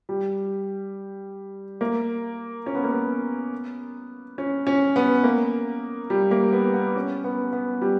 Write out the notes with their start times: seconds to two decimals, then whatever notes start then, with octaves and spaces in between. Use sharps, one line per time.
0.09 G3
1.81 A#3
2.66 C#4
2.75 B3
2.84 A#3
2.92 B3
4.38 C#4
4.67 C#4
4.96 B3
5.24 A#3
6.10 G3
6.31 A#3
6.53 B3
6.74 B3
6.96 C#4
7.24 B3
7.53 B3
7.81 G3